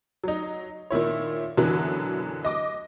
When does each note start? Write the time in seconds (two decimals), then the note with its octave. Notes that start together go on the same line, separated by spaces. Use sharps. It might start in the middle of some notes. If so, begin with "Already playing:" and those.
0.24 F#3 D#4
0.90 A#2 D#3 E4 C#5
1.57 F#2 B2 D3 E3 F#3
2.44 D#5 D6